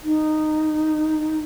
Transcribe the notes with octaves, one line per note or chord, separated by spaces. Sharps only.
D#4